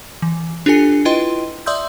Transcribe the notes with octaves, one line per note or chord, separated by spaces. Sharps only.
E3
D4 F4 G4 A4 G#5 C#7
E4 F4 B4 D#5 G5 C6
D5 E5 C6 D#6 E6 G6